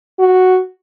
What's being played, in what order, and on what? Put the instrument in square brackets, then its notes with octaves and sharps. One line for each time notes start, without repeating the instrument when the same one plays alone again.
[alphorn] F#4